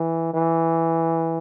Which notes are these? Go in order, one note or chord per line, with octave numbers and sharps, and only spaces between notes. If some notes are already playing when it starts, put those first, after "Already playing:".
Already playing: E3
E3